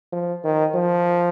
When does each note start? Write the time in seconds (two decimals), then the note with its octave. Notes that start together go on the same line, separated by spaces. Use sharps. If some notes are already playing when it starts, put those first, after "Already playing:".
0.13 F3
0.44 D#3
0.74 F3